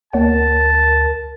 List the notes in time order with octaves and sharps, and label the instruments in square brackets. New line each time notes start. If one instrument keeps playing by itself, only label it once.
[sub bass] D2 [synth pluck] A#3 C#5 F#5 [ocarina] A#4 [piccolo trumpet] A5